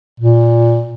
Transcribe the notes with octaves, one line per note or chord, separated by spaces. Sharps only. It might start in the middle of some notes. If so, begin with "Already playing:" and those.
A#2